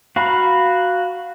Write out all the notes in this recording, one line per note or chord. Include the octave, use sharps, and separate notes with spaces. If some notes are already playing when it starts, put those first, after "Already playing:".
F#4 F5 A#5 B5